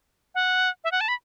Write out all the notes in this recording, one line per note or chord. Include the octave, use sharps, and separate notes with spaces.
F#5
E5
F#5
A5
B5